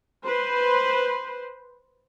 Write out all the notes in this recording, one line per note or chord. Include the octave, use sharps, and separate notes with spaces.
B4 C5